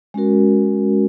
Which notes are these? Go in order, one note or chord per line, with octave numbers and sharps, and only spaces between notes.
G#3 C#4 F#4 A#4